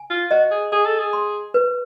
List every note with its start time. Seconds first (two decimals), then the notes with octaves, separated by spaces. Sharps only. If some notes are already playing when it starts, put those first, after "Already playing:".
Already playing: G#5
0.10 F4
0.31 F#4 D#5
0.51 G#4
0.72 G#4 G#5
0.86 A4
0.99 G#4
1.13 C6
1.54 B4